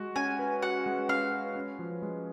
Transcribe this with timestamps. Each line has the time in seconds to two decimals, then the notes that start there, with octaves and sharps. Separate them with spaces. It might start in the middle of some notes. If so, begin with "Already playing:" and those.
Already playing: G#3 F#4
0.16 C#4 G#5
0.39 B4
0.62 F#4 F#5
0.86 G#3
1.09 C#4 F5
1.32 B4
1.56 C#4
1.79 F3
2.02 G#3